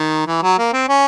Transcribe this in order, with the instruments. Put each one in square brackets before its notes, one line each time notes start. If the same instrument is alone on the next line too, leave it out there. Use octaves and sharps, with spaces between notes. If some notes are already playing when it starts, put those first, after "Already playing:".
Already playing: [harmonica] D#3
E3
F#3
A#3
C4
C#4